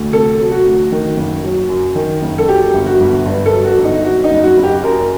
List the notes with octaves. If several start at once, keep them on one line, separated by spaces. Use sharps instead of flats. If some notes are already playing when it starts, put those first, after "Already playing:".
Already playing: D2
C3 A4
F#3
F#4
D2
D#3
F#1
F#3
F#2
D#3
F#1
A4
F#3 G4
G1
F#4
G1
G2
A4
F#3
F#4
G1
D#4
F#3 F#4
D#4
F#1
F#4
F#1
G4
F#2 A#4